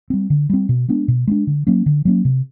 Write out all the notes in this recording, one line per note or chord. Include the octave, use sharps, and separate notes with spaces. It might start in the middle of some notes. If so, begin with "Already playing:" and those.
G3 C4
D3
G3 C4
B2
G#3 B3 D4
B2
G#3 B3 D4
D3
F#3 A#3 C#4
D3
F#3 A#3 C#4
C3